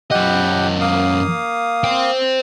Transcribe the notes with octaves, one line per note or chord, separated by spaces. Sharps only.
F#2 G4 D#5 F#5
A#3 F5 D#6
C5 G5